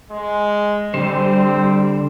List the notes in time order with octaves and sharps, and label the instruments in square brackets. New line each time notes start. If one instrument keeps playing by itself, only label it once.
[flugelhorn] G#3
[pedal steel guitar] D3 C5 [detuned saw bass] G3 [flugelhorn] C4